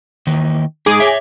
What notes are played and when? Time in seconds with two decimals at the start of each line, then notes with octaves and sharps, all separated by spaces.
0.27 D#3 E3 A#3
0.86 G#3 D#4 G#4 D6
1.00 C#5 E5